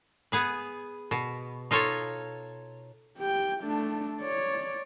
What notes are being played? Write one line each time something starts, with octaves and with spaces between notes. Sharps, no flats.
B3 G#4 B4
B2
D#4 F4 A4 C#5
G4 G5
A3 D4
C#5 D5